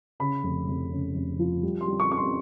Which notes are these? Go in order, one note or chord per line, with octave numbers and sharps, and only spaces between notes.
C#3 B5
F1
F1
C#3
F1
F3
G3
C6
G3
C#6
C4 C#6
C6